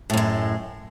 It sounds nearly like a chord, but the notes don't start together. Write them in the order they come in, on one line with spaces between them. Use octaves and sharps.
A2 F#2 G#3